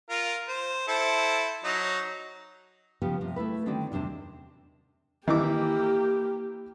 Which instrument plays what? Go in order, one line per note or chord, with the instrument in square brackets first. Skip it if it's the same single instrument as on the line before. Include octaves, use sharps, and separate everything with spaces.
[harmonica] F4 A#4
C5
E4 A4 C5
F#3 D#4
[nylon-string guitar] C#3 F3 B3 C#4 G4
C3 F3
A3 E4 A4 B4
D3 D#3 C4 C#4 F#4 D5
E2 C3 D4 C5 A5
[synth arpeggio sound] D#3 [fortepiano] E3 E4 D6 [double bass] A#3 [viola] G4